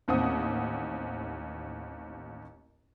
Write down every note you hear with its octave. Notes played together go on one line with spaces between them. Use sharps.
A1 D#2 C4 F#5 D#6